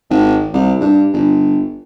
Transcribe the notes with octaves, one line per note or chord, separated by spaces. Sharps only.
G#1
C2
G2
G1